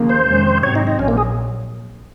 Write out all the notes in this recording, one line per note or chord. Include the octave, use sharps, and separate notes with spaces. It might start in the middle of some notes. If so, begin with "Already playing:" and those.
Already playing: D#2 C#3 F3 A#3
C5
F2 C3 D#3 G#3 C#4
G#2 F#3 C4 C#5
D#4
D#4
A#1 A#2 F#3 C#4
A#3
G#4